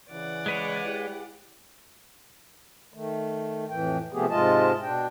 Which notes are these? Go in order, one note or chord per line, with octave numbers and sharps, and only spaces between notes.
C#3 E3 D5 F#5
G#3 B4 C#5
E4 G4 G#4
D#3 A3
F2 A2 E3 G5
C3 F3 A3 B3 G4 G#4
G#2 C3 G#3 F4 D#5 A5
B2 D4 G5